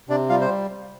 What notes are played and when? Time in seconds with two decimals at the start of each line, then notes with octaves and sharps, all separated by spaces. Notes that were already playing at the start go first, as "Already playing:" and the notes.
0.09 C3 D4 D5
0.29 G3 F4 F5
0.41 C5